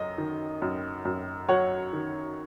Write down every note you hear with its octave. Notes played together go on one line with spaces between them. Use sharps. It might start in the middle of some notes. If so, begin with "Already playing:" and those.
Already playing: F#2 F#3 D#5
D#3
F#2
F#2
F#3 C#5 F#5
D#3